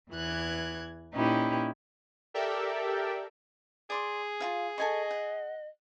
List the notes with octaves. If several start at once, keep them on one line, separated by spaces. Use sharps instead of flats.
E2 E3 F#6 G#6
A#2 C#4 D#4 E4 G4 B4
G4 A4 A#4 D5 E5 G5
G#4 D5 C6 D6
F4 F#4 F5
A4 D#5 G#5 C#6
F#5